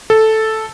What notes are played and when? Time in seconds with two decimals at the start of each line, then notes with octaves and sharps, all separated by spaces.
0.10 A4